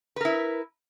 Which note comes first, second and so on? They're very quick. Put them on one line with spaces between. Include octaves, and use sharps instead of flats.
B4 A#4 E4